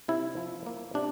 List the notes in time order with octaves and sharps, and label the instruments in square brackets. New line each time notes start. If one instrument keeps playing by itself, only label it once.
[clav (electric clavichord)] C3 E4
F3
A#3
C3 D4